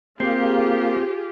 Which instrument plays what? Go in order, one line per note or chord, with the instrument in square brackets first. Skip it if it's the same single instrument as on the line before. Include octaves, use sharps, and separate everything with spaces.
[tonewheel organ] A#3 [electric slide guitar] C4 [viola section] F4 G4 G#4